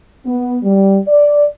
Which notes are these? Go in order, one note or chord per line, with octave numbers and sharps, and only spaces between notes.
B3
G3
D5